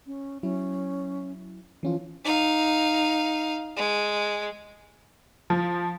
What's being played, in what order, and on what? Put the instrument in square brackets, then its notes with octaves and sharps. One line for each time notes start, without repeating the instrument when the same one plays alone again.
[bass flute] C#4
[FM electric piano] F#3 E4 [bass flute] C#4
[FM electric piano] E3 C#4 F4 [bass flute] F3
[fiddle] D#4 F5
G#3
[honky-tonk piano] F3